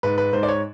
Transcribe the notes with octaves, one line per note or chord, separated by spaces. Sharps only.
G#2 B4
B4
G#2 C5
D5
C#5